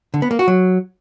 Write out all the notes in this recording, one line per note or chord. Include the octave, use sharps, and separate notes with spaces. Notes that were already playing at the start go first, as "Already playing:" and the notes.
D3
B3
A#3
F#4
F#3